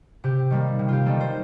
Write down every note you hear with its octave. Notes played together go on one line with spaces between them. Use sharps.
C3 G4
D#3 G3 A#3
C3
F4 G4
D#3 G3 A#3 A4
C5